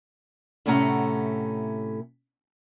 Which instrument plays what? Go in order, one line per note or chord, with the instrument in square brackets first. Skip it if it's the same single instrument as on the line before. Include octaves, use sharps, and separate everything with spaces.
[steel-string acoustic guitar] A2 C3 A3 C#4 F#5 A#5